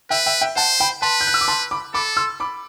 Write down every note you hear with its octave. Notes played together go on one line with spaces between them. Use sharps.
B4 E5 G5
E5 G5
E5 G5
C5 F#5 A5
G5 B5
B4 A5 C6
G6
F#6
E6
D6
A5 C6
B5 D6
A4 B5 D6
C6 E6
B5 D6